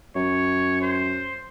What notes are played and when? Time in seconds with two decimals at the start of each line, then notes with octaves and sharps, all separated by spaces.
0.16 F#2 C#5
0.82 C5